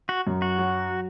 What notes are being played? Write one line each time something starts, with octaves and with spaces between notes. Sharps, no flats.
F#4
F#2
F#4
F#3